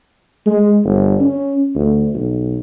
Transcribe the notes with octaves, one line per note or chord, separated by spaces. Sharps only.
G#3
G1
C#4
D2
B1